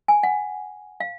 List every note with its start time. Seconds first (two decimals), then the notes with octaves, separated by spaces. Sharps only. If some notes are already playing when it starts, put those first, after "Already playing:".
0.08 G#5
0.23 F#5
1.00 F5